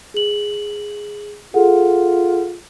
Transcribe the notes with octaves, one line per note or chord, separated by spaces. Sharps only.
G#4 F#7
F4 G#4 A4 F#5